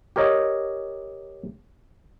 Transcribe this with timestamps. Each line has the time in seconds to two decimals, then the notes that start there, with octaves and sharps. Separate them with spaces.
0.16 G4 A#4 C#5 D#5